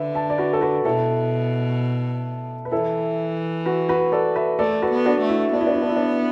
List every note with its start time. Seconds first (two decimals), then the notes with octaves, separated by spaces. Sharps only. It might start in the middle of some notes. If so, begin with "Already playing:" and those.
Already playing: D3 B4 E5
0.15 E5 A5
0.30 D5
0.38 F#4 B4
0.53 A4
0.61 F#4 B4
0.84 B2 E4 A4
2.65 B4
2.72 E3 E4 A4
3.66 F#4 B4
3.89 F#4 B4
4.12 A4 D5
4.36 B4 E5
4.59 A3 A4 D5
4.82 F#4 B4
4.91 B3
5.06 D4 F#4
5.21 A3
5.29 E4
5.52 B3 D4
5.61 E4
5.67 D4
5.74 E4
5.82 D4
5.89 E4
5.96 D4